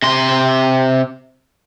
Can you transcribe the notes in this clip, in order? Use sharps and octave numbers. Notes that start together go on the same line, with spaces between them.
C3 C6